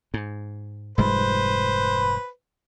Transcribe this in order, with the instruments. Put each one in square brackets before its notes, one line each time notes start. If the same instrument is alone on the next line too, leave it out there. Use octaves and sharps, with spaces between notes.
[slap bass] G#2
[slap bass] F1 G#2 G3 [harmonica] B4 C5